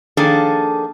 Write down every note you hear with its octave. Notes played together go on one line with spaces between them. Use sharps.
D#3 F3 A#3 D4 G#4 A4